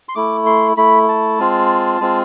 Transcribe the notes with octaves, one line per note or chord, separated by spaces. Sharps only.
C6
A3 E4 D6
C6
A3 E4 B5
A5
G#3 C4 F4
G#3 C4 F4